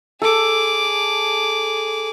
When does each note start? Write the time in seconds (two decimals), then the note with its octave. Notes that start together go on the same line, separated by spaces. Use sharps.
0.22 G#4 A4 D6